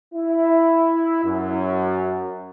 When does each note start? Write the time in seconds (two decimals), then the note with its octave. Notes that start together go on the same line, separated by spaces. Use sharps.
0.14 E4
1.25 F#2